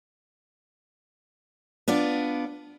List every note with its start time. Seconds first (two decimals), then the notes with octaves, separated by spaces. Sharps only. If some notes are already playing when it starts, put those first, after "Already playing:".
1.88 B3 D4 F4 D5